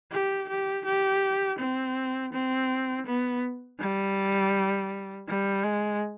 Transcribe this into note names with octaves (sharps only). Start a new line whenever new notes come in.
G4
G4
G4
C4
C4
B3
G3
G3
G#3